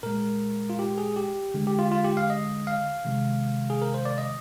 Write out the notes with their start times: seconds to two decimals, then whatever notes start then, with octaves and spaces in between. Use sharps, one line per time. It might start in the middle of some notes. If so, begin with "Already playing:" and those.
0.03 A#2 G#3 A#4
0.70 F4
0.79 G4
0.98 G#4
1.16 G4
1.54 D3 G#3
1.67 G4
1.79 F4
1.92 F4
2.04 G4
2.17 F5
2.30 D#5
2.67 F5
3.05 C3 D#3 G#3
3.70 G#4
3.82 A#4
3.94 C5
4.05 D5
4.18 D#5